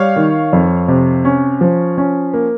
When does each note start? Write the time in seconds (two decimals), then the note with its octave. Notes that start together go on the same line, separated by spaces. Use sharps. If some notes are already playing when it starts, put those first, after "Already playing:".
Already playing: G3 C#5 F5
0.16 D#3
0.53 F2
0.88 C3
1.25 C#4
1.61 F3
1.98 C#4
2.34 A#3